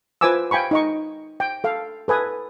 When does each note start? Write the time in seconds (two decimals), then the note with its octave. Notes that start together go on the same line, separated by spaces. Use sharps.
0.21 F4 B4 C5 G#5 D6 E6
0.51 F5 G5 G#5 B5 C#6
0.71 D#4 D#5 C#6
1.40 G5
1.64 A4 F5
2.08 A4 B4 G#5 D#6